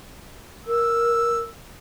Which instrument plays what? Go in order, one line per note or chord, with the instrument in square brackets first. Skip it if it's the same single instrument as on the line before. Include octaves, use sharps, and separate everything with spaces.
[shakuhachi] A#4 [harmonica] E6